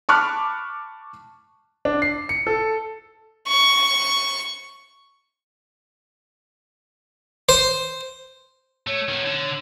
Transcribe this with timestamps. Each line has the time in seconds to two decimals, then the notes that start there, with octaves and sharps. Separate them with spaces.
0.09 A5 B5 C#6 D6 F6 F#6
1.85 D4
2.02 C7
2.29 C#7
2.47 A4
3.48 C#6
7.49 C5
8.87 A3 C#5
9.08 D#3 B3
9.26 D3